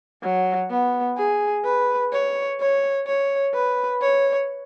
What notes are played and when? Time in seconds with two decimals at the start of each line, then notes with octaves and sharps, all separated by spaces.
0.23 F#3
0.71 B3
1.17 G#4
1.65 B4
2.13 C#5
2.60 C#5
3.07 C#5
3.54 B4
4.02 C#5